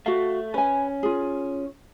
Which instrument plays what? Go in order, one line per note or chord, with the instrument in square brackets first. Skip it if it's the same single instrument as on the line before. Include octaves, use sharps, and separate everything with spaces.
[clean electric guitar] A3 [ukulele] F#4 F5
[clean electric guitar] C#4 [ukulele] B4 G#5
[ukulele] F4 G#4